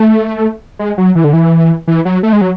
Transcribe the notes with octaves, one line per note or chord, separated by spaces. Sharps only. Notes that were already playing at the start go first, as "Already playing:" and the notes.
Already playing: A3
G#3
F#3
E3
D3
E3
E3
F#3
A3
G#3
F#3